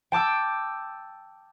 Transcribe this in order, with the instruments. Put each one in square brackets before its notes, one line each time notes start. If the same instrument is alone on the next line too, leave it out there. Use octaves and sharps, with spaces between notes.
[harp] G5 A5 D6 E6